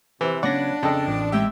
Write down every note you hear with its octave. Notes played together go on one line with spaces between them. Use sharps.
C3 E3
C#3 F#3 B3 D4 D5 F#5 A#6
F2 C#3 A4 D#5 G5
A1
G#3 C4 G4 E5